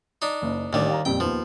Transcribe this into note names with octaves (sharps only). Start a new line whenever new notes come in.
D4 D#4
F#1
A1 D#2 G3 D4
F5 A#5
F2 A#2 G3 G5
D#2 F3 B3